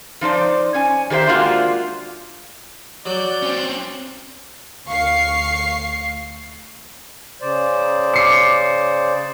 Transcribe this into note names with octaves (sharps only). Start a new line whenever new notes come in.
F3 D#4 C5 D5
C#4 G#5
D#3 G4 A4 C5 E5
G#3 A#3 D4 F4 F#4
F#3 D5 F#6 G6
C4 C#4
D2 F5 C#6 C7
C#3 C5 D5
D6 C7 C#7